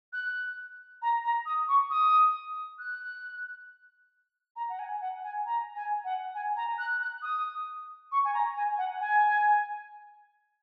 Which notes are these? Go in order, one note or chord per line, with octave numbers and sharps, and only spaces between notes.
F#6
A#5
A#5
D#6
C#6
D#6
F#6
A#5
F#5
G#5
F#5
G#5
A#5
G#5
F#5
G#5
A#5
F#6
F#6
D#6
C#6
G#5
A#5
G#5
F#5
G#5